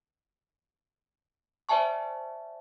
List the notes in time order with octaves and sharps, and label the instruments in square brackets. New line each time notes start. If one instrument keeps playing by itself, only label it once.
[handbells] C5 D5 E5 G#5 A5 C#6